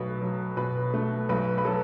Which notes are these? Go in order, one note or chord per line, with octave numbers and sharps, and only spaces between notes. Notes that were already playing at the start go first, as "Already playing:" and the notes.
Already playing: B1 B2 A3 B4
F#3
B2 B4
A3
B1 B4
B4
F#3 A4